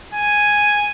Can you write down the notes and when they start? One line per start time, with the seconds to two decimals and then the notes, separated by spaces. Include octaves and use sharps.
0.14 G#5